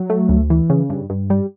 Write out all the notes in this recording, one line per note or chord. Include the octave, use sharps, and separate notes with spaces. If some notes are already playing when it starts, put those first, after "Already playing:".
Already playing: F#3
A3
D2
E3
C#3
G2
G2
G3